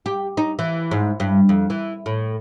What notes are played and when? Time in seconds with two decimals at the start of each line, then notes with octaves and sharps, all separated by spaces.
0.06 G4
0.37 D#4
0.59 E3
0.91 G#2
1.20 G2
1.49 F2
1.70 E3
2.06 A2